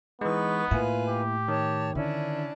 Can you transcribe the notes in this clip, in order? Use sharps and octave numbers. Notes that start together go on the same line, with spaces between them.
E3 G#3 B3 D#4 B4 C#6
A2 A#3 E4 F4 B4 G#5
G4
D#3 C#5 A5
D3 C#4 D4 E4